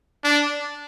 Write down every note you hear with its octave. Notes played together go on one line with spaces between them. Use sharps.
D4